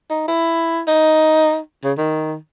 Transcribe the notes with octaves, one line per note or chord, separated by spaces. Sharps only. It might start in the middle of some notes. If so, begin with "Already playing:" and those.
D#4
E4
D#4
C#3
D#3